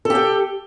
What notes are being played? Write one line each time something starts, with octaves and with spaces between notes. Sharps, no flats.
G4 A4 G5